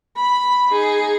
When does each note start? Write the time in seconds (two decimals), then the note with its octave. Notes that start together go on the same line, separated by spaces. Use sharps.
0.16 B5
0.69 D#4 G#4